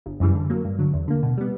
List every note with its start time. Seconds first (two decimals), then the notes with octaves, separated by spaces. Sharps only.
0.06 G1
0.20 F#2 C#3 E3 G3
0.35 D3
0.50 F#3 A#3
0.65 G2
0.79 D3 F#3
0.94 E2
1.08 D3 A#3
1.23 B2
1.37 G3 B3